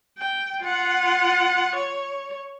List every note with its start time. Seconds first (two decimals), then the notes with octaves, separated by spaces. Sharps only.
0.18 G5
0.63 F4 F#5
1.75 C#5